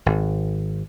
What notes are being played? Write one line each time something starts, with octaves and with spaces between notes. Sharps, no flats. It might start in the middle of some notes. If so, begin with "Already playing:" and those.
G#1